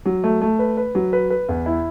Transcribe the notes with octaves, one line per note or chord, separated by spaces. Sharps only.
F#3
A3
A3
B4
B4
F#3
B4
B4
E2
E4